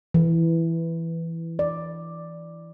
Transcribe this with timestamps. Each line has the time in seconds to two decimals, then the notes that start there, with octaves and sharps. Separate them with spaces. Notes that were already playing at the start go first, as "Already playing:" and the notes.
0.14 E3
1.59 D5